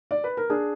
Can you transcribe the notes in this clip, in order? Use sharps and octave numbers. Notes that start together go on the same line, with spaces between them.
D5
B4
A#4
D4 G#4